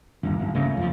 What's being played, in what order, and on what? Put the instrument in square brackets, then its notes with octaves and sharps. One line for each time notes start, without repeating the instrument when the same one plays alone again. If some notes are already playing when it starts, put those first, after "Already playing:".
[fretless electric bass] G1 D#2
G#1
G1 C#3 A3 A#3
F2 F3